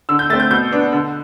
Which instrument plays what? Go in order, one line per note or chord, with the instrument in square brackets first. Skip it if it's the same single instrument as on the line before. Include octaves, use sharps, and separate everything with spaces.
[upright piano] D3 E6
G6
A3 A6
C4
G6
B2 G6
B3 D4
D3